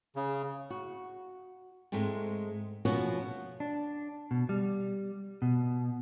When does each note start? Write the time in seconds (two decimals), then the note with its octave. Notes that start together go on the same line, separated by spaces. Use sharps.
0.16 C#3
0.70 F#4
1.92 G#2 G#3 A3 C4
2.85 B2 F3 B3 C#4 F#4
3.60 D4
4.31 B2
4.49 G3
5.42 B2